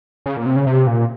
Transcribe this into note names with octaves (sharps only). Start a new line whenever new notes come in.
C#3
A#2
C3
C#3
C3
A#2